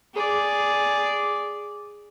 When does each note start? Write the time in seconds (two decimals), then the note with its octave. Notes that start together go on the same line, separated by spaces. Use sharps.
0.14 G#4 D5